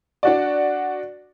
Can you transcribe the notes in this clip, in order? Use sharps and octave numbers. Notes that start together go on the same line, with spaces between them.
D4 F#4 D5